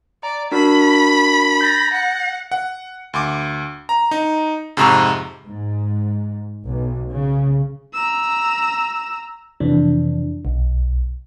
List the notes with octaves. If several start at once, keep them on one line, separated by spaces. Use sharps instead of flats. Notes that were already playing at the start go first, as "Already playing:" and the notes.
D5 A#5
D4 F#4 A#4 B5
G6 A6 A#6
F#5
F#5
D2 C6 D6
A#5
D#4
F2 G#2 C3 A#5 C#6 E6
G#2
B1
C#3
A#5 E6
F2 C3 E3 D4
B1